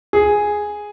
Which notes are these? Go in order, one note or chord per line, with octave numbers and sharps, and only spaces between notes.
G#4